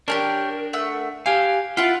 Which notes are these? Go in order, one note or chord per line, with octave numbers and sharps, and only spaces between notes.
D4 G4 G#4 A#4 C#5
A3 F#5 E6
G4 F5 G#5
E4 F4 F#5 A5